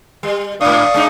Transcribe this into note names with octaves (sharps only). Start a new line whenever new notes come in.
G3
G#2 D4 D5 F5 C#6 D#6
G#3 D4 D#4